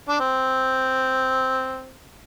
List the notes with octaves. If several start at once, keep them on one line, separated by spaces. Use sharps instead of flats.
D4
C4